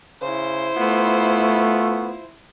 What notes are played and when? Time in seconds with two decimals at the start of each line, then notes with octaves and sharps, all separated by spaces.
0.22 C#3 E4 C5
0.77 A3 B3 F4